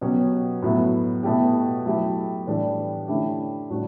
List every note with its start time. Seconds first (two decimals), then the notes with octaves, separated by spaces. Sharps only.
0.01 B2 F#3 C#4 G4
0.62 A2 F#3 B3 E4
1.23 B2 A3 E4 G4
1.86 F#3 A3 E4 G4
2.47 A2 E3 G3 D4 G4
3.08 D3 A3 C#4 E4 G4
3.70 A2 G3 D4 F#4